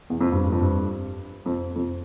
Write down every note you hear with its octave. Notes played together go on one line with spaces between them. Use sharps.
E2
F2
G2
G2
F2
G2
F2
F2